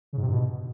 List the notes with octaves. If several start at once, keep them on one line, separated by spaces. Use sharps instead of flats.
C#3
G#2
C3
G2
B2